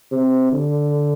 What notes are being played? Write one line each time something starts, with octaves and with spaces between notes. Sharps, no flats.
C3
D3